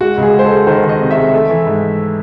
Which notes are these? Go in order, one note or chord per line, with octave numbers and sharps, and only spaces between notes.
G#3 F#4
C#2
G#4
G#3
C5
A4
G#3
D#3 C5
D#3
D#5
C3
E5
G#3
A3
E3
G#2